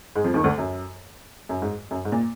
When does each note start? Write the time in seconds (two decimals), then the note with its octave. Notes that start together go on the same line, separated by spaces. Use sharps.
0.16 G#2 G#3
0.24 F2 F3
0.34 D#2 D#3
0.44 D2 D3
0.58 F#2
1.49 F#2
1.62 G#2
1.91 F#2
2.05 G#2
2.12 A#2